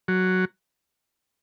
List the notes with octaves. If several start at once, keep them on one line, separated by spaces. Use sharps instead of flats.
F#3